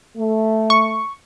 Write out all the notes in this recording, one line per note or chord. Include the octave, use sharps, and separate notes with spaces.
A3
C#6